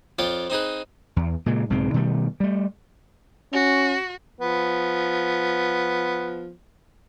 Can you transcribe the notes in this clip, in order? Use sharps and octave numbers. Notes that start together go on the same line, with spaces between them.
F2 F4 C#5 D5 G5
C4 D#4 G#4 B4
E2
A#2 C#3 G#3
B1 G#2 C#3 C4
B2 D#3 G3 A3
G3 A3
C#4 F#4
F3 B3